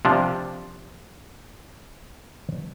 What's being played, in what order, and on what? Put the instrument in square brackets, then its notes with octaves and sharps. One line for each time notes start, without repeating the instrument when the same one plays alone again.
[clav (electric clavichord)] C3 F3 D4